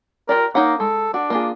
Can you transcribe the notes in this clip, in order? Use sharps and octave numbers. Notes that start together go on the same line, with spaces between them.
F4 G4 A#4 D5
A#3 D#4 C#5 F#5
G#3 A4
D4 F#4
A#3 F4 G#4